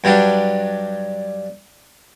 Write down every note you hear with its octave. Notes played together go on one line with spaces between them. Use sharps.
G2 F#3 G3 D4